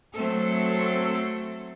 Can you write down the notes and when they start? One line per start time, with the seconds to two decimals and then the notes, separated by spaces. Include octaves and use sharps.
0.14 F#3 A3 C4 A4